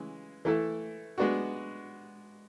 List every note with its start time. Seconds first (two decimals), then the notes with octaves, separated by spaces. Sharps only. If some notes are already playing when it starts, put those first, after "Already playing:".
Already playing: C#3 E3 G#3
0.45 E3 A3 E4 A4
1.18 G#3 B3 D4 F#4